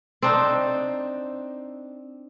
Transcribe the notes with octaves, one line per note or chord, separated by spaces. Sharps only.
C4 D4 D#4